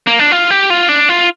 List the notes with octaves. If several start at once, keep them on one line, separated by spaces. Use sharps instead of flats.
A#3
D4
F4
G4
F4
D4
F4